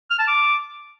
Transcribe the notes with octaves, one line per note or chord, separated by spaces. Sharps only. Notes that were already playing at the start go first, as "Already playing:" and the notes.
F6
A5
D6